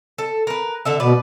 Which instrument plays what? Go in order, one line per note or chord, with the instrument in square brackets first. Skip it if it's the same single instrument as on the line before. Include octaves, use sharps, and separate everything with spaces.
[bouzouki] A4
A#4 B4
D3 A4 E5
[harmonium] B2 [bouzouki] B4 D5